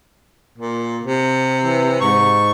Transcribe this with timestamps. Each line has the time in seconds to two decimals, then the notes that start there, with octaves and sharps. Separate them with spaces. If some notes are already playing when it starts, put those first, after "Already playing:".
0.58 A#2
1.03 C3
1.63 E3
2.01 G#2 C#6